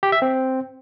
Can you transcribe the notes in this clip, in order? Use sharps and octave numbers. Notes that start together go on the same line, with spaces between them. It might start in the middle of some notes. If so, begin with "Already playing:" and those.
G4
E5
C4